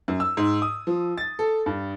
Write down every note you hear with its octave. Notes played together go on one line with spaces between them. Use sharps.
F#2
E6
G#2
D#6
F3
A6
A4
G2